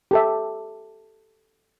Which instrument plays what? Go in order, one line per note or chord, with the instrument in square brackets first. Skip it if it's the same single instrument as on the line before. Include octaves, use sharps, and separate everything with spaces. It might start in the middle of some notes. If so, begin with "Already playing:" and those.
[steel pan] G4 A4 E5